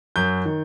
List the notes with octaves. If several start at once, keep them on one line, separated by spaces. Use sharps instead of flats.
F#2 G6
D#3